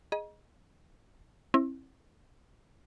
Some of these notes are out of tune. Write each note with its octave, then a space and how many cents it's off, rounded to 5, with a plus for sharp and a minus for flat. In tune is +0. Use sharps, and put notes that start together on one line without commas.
G#4 +0 D#5 +0 A#5 +45
C4 +35 E4 +0